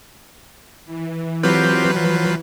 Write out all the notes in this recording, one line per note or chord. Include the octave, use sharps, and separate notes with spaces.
E3
F#3 C4 F4 G4 B4
F3